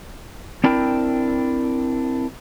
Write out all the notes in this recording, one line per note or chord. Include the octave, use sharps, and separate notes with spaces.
C4 D4 E4 A#4 G5